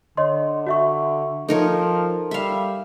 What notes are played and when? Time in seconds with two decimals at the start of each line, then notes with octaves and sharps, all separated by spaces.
0.17 D3 C#5 D#5 C6
0.67 F#4 E5 C#6
1.48 F3 D#4 A4 A#4 C#5
2.31 G3 E5 F5